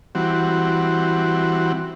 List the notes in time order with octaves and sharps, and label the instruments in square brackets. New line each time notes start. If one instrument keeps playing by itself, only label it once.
[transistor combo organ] E3 G3 C4 F#4